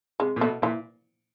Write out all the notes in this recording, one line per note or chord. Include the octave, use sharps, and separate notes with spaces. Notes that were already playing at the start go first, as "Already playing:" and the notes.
C3 G#3
A#2
B2 A3
A#2 E3